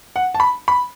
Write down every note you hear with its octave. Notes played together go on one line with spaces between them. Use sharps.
F#5
A5
B5
B5